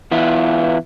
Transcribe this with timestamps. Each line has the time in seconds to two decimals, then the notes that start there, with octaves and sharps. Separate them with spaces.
0.11 E3 B3 E4 F4